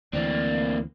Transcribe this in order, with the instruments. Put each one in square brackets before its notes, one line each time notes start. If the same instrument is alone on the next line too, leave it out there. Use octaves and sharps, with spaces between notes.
[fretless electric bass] D2 E3 [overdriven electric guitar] A#3 C4 [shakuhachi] D5